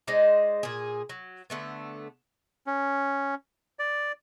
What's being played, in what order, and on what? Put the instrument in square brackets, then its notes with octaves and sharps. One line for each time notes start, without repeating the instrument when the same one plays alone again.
[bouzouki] G#3 D#4 C5 D5
A#2 G#4
F#3
D3 A3 B3
[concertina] C#4
D5